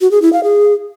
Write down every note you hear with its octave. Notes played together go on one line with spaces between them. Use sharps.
F#4
G#4
E4
F5
G#4